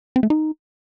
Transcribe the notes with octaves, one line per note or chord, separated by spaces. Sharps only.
C4
A3
D#4